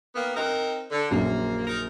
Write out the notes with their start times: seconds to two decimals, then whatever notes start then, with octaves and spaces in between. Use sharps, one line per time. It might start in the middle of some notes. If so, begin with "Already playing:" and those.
0.15 D#3 A#3 B3
0.36 C4 D#4 A#4 F6 F#6
0.91 D3
1.11 A#1 F#2 A#3
1.67 D#4 A#4